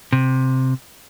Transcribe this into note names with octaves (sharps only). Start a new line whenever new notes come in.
C3